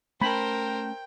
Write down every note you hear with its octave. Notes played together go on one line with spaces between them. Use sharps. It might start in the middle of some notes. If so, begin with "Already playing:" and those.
A3 C#4 A#4 C5 G5 A5 B5